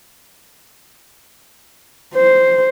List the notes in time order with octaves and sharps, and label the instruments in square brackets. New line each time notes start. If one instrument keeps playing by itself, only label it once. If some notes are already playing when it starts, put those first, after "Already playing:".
[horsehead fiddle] C5